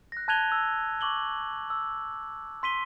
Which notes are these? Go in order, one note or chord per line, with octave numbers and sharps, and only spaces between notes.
F#6 A#6
A5 F#6 G#6 D#7 F7 G7
E6
C#6 D6 F#7 G7
E6
C6 B6 D#7 G7